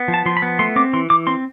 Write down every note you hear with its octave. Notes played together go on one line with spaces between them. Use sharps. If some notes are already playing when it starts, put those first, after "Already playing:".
Already playing: B3
F3
A5
F3 C6
B5
B3
A3 C6
C4 D6
E3 C6
E3 D6
C4 C6